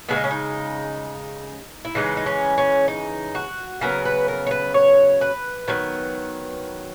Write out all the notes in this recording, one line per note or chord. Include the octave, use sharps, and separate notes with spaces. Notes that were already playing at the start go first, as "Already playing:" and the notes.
C#3 G#3 B3 E4
D#4
C#4
D#4
E4
C#3 E3 G#3 D#4
D#4
C#4
C#4
D#4
F#4
C#3 F#3 B3 A#4
B4
A#4
C#5
B4
C#5
B4
D#3 F#3 B3